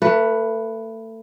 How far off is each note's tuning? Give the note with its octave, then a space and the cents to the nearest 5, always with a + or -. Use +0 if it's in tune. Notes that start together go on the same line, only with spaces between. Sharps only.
A3 +30 B4 +0